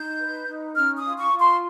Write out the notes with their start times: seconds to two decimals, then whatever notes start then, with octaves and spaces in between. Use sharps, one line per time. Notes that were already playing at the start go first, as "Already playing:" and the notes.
Already playing: D#4 G6
0.19 B4
0.47 D#4
0.76 C#4 F6
0.98 D#6
1.04 F4
1.18 C#6
1.33 F4
1.39 C6